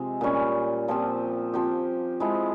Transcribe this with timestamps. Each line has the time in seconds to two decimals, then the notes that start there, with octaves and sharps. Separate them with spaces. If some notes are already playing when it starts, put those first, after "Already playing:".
Already playing: C3 F3 G#3 C4
0.21 A#2 G3 C#4
0.88 A#2 F3 C4 G4
1.54 F3 C4 G4
2.20 F3 G#3 E4